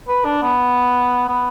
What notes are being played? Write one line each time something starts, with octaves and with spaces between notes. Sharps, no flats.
B4
D4
B3
B3